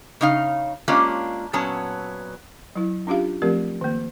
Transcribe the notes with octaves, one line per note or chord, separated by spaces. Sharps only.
C#3 D#4 F5
G#3 A#3 C#4 D4 F4 G4
A#2 F#3 B3 C#4 A5
F#3 E4
C#4 D4 F4 G4 F5
F3 A3 C4 G4 A#4
D#3 A#3